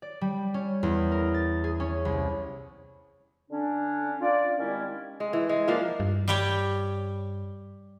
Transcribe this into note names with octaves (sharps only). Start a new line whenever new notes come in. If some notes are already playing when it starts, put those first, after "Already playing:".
D5
G3
C#4
E2
A#4
A6
G#4
C#4
C2
D3 C#4 D4
F4 D5
D#3 G3 G#3 C4 C#4 E4
G#3
E3
G#3
F3 A#3 D4 F5
G2
G3 G4 C#5